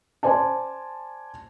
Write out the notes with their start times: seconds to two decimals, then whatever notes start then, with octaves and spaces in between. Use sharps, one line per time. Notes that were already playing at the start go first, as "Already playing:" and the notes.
0.23 C5 D5 G#5 A5